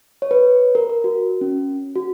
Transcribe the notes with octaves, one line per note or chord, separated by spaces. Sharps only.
C#5
B4
A#4
A#4
F#4
C#4
F#4